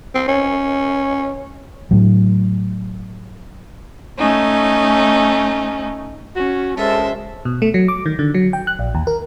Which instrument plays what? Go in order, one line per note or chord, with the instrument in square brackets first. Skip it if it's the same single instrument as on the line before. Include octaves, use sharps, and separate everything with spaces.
[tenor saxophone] C4
C#4
[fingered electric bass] A2 F#3
[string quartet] A3 C#4 D#4
[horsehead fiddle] C#4 [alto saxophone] F#4
[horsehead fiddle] G#3 [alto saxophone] C#4 [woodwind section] A4 A#4 A5 [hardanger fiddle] C5 E5
[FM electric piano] B2
A3
F#3
D6
D#3
D3
F#3
G5
F#6
A#1
D#2
A#4